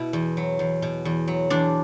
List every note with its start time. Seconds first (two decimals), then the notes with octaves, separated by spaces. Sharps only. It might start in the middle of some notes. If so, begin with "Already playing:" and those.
Already playing: B2 E4
0.13 E2
0.37 F#3
0.59 E2
0.82 B2
1.05 E2
1.28 F#3
1.50 E2 D4